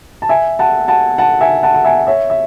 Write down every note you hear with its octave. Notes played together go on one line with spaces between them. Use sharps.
A5
E5 G#5
F#5 A5
F#5 A5
F#5 A5
E5 G#5
F#5 A5
F#5
E5 G#5
C#5 E5
E5